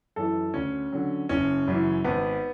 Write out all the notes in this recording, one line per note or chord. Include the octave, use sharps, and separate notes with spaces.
F#2 E3 A4
D2 C#4
D3 F#3
F#1 C#4
F#2 C#3 E3
G#1 B3